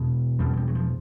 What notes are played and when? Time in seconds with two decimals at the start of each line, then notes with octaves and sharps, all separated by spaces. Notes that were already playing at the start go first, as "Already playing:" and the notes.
Already playing: E2 B2
0.39 E2 B2 G3
0.53 G#3
0.57 G3
0.68 F#3
0.75 F3